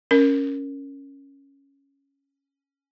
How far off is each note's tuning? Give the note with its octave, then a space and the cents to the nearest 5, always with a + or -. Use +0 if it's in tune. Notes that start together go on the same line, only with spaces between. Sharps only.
C#4 +0 A#4 +0